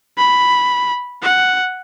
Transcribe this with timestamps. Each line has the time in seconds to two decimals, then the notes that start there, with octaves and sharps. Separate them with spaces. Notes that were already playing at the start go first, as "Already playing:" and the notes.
0.18 B5
1.23 F#5